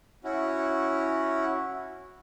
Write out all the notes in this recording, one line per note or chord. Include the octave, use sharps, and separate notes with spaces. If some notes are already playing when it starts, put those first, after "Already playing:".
C#4 E4 F#4